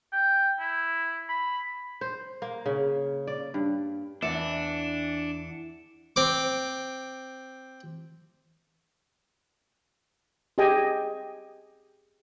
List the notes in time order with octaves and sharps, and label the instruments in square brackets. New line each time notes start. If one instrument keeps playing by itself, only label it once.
[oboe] G5
E4
B5
[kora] C5
A#3
C#3
D5
G2
[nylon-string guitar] E2 E3 E5 [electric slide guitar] D4 [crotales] C#7 E7
[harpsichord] C4 D6
[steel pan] G4 G#4 D#5 G5 G#5